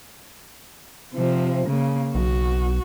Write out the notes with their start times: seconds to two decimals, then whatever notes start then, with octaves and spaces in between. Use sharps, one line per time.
1.15 C3 F3
1.67 C#3 A#3
2.15 B1 F#4